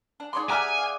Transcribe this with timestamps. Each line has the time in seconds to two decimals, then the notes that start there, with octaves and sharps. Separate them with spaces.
0.20 D4
0.33 D#4 G#4 C#5 D5 C6
0.49 G4 D5 E5 F#5 G#5 A#5 F6
0.78 F5